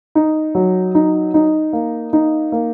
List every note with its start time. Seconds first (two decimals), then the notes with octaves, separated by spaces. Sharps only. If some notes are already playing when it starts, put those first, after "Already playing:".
0.15 D#4
0.55 F#3
0.95 D#4
1.34 D#4
1.73 A#3
2.13 D#4
2.52 A#3